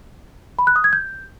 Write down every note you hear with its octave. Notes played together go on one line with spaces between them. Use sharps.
B5
F#6
D#6
G#6
G6